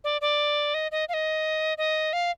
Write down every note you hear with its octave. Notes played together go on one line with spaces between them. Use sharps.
D5
D5
D#5
D#5
F5
D#5
D#5
F5